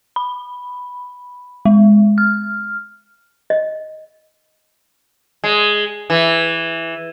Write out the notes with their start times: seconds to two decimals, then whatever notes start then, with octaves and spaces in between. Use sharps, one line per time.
0.16 B5
1.65 G#3
2.18 F6
3.50 D#5
5.44 G#3
6.10 E3